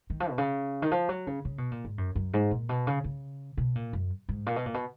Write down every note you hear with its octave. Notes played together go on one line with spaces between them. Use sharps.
D#3
F3
B2
C#3
D#3
F3
F#3
C#3
C#3
B2
A#2
G#2
F#2
F#2
G#2
A#2
B2
C#3
C#3
B2
A#2
F#2
G#2
A#2
B2
A#2
B2